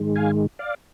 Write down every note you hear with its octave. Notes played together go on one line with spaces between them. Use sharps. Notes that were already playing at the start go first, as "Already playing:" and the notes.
Already playing: G#2 D#3 G#3
F5 G#5
D5 F5